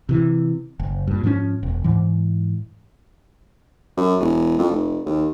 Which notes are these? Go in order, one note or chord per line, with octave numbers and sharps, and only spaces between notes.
C3 E3
F#1
G2 A#2
G#2 F3 C4 C#4
E1
G#2 E3
F#2
E1
F2
F1
D#2